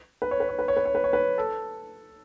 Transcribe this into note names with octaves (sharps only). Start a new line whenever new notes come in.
B4
C#5
B4
C#5
B4
C#5
B4
C#5
B4
C#5
B4
A4